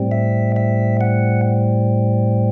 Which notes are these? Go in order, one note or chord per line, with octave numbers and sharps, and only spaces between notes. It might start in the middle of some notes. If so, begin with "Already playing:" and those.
Already playing: A2 G3 C4
E5
E5
F#5